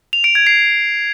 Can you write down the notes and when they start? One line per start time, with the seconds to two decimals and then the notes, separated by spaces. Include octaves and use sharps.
0.13 F7
0.24 D7
0.35 G#6
0.47 C7